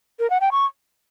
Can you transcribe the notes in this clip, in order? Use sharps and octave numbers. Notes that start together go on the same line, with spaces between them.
A#4
F#5
G5
C#6